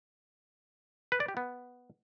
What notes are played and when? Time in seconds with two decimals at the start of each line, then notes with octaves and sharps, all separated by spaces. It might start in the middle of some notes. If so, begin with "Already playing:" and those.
1.12 B4
1.20 D5
1.28 G4
1.37 B3